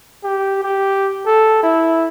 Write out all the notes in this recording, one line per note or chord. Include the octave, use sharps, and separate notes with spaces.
G4
G4
A4
E4